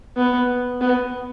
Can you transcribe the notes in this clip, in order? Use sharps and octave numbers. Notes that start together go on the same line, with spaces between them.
B3
B3